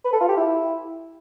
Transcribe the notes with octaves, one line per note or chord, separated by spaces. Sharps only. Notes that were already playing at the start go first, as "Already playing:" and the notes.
B4
A4
F4
G4
E4